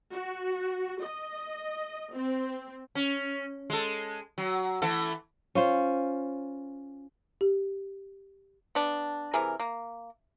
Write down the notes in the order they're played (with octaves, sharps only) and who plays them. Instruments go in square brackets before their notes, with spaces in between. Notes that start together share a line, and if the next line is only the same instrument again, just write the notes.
[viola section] F#4
D#5
C4
[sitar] C#4
G#3 A4
F#3
E3 A3 A4
[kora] C#4 F4 C5
[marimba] G4
[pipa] B3 D4
C3 E3 G#4 A#4
A#3